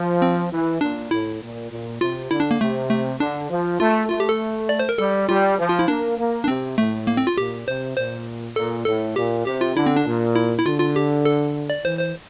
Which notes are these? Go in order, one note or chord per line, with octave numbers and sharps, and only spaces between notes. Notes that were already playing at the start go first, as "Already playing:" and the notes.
Already playing: F3
C4
E3
A#2 D4
A2 E4
A#2
A#2
C3 F4
D3 E4
D4
A#3
C3 A3
A3
D3 D4
F3
A3 F4
A3 F4
G4
A4
D5
C5
A#4
G3 A4
G3 F4
F3
F4
E4
A#3 D4
A#3
D4
C3 C4
A2 A3
A#3
C4
F4
A#2 G4
C3 C5
A#2 C5
A#2 A4
A2 A4
A#2 G4
C3 G4
F4
D3 E4
C4
D4
A#2
E4
E4
D3 F4
F4
G4
A4
D5
E3 C5
C5